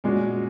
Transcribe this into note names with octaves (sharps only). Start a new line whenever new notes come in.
A#2 G#3 C#4 F#4